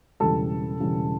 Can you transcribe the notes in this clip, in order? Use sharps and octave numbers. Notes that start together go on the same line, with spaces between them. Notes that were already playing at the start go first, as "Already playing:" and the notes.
E1 E2 C#3 G3 A4 A5
E1 E2 C#3 G3